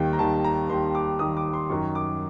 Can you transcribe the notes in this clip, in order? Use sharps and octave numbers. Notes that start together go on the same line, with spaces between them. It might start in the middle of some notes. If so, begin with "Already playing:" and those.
Already playing: D#2 D#3 G3 G5
A#5
D#2 D#3 G3 A5
A#5
D#2 D#3 G3 C6
D6
D#2 D#3 G3 D#6
D6
C6
F#2 D#3 F#3 C#6
D6